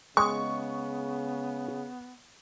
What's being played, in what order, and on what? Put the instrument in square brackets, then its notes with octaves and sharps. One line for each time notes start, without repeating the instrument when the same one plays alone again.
[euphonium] C#3 [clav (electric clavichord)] G#3 [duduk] B3 [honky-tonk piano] C#6